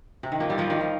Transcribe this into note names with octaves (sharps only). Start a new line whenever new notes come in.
C3
D#3
F3 A#3
G3 C4
F3 A#3
D#3 G3
F3